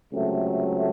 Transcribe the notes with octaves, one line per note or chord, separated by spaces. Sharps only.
C#2 C3 F#3 A3